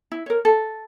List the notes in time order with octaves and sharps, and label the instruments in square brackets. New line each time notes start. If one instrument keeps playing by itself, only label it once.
[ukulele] E4
A#4 C#5
A4